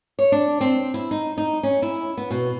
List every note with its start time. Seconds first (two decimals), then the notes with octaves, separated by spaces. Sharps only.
0.19 C#5
0.32 D4
0.61 C4
0.94 E4
1.11 D#4
1.38 D#4
1.63 C#4
1.82 E4
2.17 B3
2.31 B2